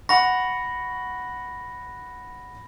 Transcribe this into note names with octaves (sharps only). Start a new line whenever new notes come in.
F#5 B5 C#6 A#6